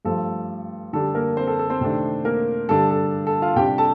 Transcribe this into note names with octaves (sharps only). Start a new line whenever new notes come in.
G2 F3 A3 A4
D3 G3 D4 A4
A#3 A#4
C4 C5
A4
A4
C4 C5
C3 D#3 A3 D4
A#3 A#4
G2 D3 G3 D4 A4
A4
A4
F4 F5
C3 G3 D4 G4 G5
A4 A5